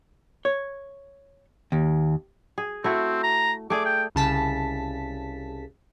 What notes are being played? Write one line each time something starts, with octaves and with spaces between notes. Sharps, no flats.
C#5
D#2
G#4
A3 C4 E4 F#4
A#5
A3 G#4 D5 D6
G5
C2 C#3 A5 B6